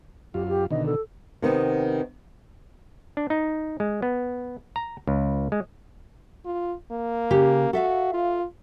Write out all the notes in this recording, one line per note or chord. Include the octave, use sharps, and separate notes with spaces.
F#2 F4 G4
G4
B2 D3 D#3 D#5
A4
C3 D#3 B3
D4
D#4
G#3
B3
A#5
C#2
G#3
F4
A#3
C#3 G4
F#4 A4 E5 F5
F4